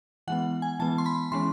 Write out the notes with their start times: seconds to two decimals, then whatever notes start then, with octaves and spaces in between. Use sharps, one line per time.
0.27 E3 G#3 B3 F#5
0.62 G#5
0.79 E3 G#3 B3 A5
0.98 C6
1.06 B5
1.32 E3 G#3 C#4 C6